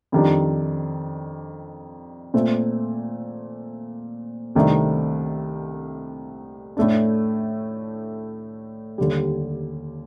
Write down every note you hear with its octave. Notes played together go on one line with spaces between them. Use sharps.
F2 D#3 G3 D4
A#2 A3 C4
C2 C3 D#3 A3 D4
A2 A3 D4
D#2 D3 G3